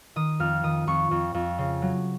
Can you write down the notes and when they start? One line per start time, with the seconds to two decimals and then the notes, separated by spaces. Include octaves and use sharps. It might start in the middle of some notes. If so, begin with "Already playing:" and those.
0.16 D#3 D#6
0.40 F2 F6
0.63 D#3 D#6
0.87 F2 C#6
1.11 F2
1.34 F2
1.58 C#3
1.82 F#3